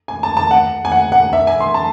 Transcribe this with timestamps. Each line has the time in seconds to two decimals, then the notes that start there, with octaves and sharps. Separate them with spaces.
0.08 G#5
0.23 A5
0.37 A5
0.51 F#5
0.85 G#5
0.92 F#5
1.12 F#5
1.33 E5
1.47 G#5
1.60 C6
1.74 A5